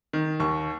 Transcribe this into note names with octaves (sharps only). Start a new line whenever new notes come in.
D#3
D#2 C#6